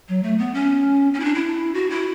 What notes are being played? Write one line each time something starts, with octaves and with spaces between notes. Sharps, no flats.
F#3
A3
B3
C#4
C#4
E4
D4
E4
F#4
E4